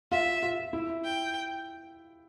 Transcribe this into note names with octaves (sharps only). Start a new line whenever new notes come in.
F4 E5
F4
E4
G5